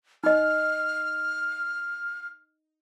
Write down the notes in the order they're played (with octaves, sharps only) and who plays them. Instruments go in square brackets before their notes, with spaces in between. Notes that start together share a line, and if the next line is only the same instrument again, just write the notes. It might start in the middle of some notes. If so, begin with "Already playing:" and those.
[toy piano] D#4 D#5 [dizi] F6